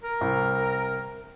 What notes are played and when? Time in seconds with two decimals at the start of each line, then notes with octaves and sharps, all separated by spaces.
0.03 A#4
0.21 C2